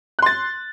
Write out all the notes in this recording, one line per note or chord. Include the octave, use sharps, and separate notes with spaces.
C6 F#6 A6